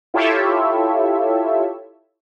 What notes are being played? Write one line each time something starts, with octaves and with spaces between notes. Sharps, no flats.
E4 F4 G4 A4 C#5 E5